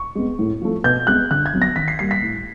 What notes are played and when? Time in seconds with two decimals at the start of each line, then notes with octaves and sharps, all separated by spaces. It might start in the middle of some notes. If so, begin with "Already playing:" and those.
Already playing: C#6
0.15 G#3 B3
0.39 A2
0.61 F3 A3
0.84 B2 G6
1.07 G#3 B3 F#6
1.31 D3 F#6
1.46 G#6
1.53 F#3 B3
1.62 A#6
1.76 D#3 B6
1.88 C7
1.99 G3 A#3 C7
2.11 B6
2.23 A2